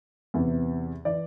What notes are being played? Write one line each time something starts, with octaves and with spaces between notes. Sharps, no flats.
E2 C3 E3
E3 D5